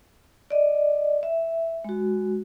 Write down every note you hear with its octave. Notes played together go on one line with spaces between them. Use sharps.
D5 D#5
E5
G#3 F#4